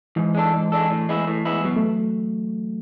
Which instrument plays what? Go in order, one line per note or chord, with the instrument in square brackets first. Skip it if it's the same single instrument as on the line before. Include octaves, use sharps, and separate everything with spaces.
[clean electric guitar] G#2 [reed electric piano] E3
[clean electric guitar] G#3 D4 A4
G#2
G#3 D4 A4
A2
G#3 B3 E4
A2
G#3 B3 E4
[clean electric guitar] B2 [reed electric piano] F#3
[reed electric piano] A3